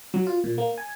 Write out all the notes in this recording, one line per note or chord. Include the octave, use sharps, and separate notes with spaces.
F#3
F4
A#2
A#3
G#5